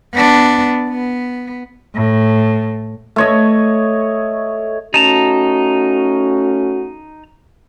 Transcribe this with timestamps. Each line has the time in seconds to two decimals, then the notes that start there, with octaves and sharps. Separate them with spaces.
0.14 B3 D4
0.89 B3
1.95 A2
3.16 A3 C#5 D#5
4.94 A3 C#4 D#4 F#4 A5 A#5